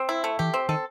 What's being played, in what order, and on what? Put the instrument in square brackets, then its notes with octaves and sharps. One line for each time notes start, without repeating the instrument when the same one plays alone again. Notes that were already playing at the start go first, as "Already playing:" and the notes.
Already playing: [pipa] C4
E4
A3
[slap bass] E3 [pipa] G4
[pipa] C4
[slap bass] D#3 [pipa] A4